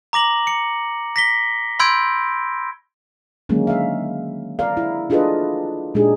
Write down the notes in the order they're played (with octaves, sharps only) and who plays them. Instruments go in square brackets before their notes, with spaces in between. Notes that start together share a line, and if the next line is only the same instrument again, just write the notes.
[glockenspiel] A#5 D6 A#6 F#7
C#7
A#6 B6 G7
B5 C6 E6 G6 G#6 D7
[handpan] D3 D#3 F#3 G#3 A#3 C#4
E5 F5
C4 A#4 D5 F5
E4
D4 F4 G#4 A4 B4 D#5
A#2 G#3 D4 D#4 G4 G#4